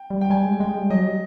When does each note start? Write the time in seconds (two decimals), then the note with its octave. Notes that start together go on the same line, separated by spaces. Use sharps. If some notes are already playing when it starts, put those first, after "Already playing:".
Already playing: G5
0.10 G3
0.21 G5
0.30 G3 G#5
0.45 G#3
0.60 G#3 G5
0.76 G3
0.90 F#3 D#5
1.05 G3